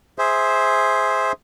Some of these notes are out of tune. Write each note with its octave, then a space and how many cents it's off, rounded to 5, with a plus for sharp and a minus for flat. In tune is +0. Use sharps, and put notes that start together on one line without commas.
G#4 +0 C5 +0 E5 -15